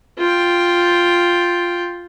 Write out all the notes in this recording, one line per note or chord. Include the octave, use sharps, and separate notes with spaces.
F4 G5